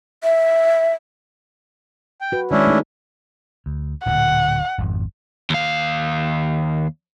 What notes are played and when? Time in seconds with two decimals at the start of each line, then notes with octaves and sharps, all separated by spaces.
0.24 E5
2.21 G5
2.32 F#4 B4
2.51 D#3 G#3 C#4 D4 E4
2.67 A3 D#4
3.66 D2
4.06 D1 A#2 D3 F#5
4.78 G#1 F2
5.50 D#2 F5